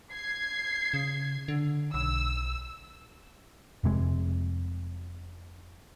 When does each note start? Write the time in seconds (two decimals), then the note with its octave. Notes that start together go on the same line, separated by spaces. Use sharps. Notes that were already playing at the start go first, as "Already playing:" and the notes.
0.12 G#6 C7
0.94 C#3
1.48 D3
1.94 B1 E6
3.84 F1 C3 G#3